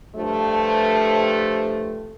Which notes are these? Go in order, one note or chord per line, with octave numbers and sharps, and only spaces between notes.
G2 F3 A3